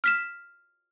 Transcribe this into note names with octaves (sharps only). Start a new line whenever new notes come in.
F6 B6 E7